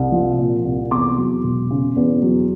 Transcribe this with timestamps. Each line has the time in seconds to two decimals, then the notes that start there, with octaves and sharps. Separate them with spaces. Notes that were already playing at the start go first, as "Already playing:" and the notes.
Already playing: C2
0.12 F3
0.38 A#2
0.65 C2
0.91 E2 C6 D6
1.18 F#3
1.44 E1
1.70 C#3
1.96 E2
2.22 F#3